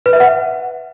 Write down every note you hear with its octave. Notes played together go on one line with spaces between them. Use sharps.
B4
E5
F#5